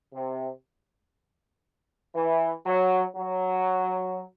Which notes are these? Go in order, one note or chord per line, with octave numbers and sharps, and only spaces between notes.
C3
E3
F#3
F#3